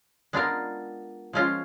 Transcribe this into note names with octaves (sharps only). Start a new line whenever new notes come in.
G#3 B3 D4 F4 A#4
F3 G#3 C#4 F4